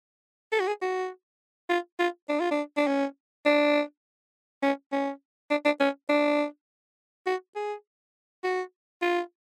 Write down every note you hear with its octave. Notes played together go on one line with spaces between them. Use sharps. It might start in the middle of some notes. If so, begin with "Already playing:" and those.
A4
F#4
G#4
F#4
F4
F4
D4
F4
D4
D4
C#4
D4
C#4
C#4
D4
D4
C#4
D4
F#4
G#4
F#4
F4